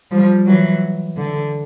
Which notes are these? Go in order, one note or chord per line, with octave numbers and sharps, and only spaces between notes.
F3 G3
E3 F#3
D3